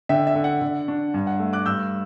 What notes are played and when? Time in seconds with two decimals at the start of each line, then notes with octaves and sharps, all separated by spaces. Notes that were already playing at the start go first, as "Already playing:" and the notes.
0.09 D3 E5 G5
0.27 E5
0.35 D3
0.44 F#5
0.62 D3
0.88 D4
1.14 G2
1.27 F#5
1.39 A3
1.53 D6 F#6
1.66 G2 E6 G6